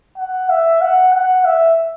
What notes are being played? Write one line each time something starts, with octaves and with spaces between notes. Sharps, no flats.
F#5
E5
F#5
F#5
E5